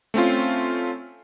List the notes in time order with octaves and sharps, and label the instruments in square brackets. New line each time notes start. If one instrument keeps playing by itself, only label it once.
[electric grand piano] A3 C4 C#4 F4